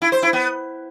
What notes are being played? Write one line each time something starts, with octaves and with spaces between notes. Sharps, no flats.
E4
C5
E4
B3